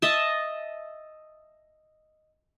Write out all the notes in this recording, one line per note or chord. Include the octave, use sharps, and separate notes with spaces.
D#5 E5 A5